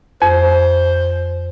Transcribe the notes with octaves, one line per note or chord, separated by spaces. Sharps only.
F2 C5